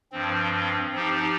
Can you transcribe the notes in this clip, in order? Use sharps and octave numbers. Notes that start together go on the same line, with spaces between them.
G2 F3 C4
F3 C4 D#4 G4